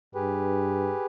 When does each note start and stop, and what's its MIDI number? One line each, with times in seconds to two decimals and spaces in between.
0.15 0.94 43
0.15 1.06 67
0.15 1.06 68
0.15 1.06 71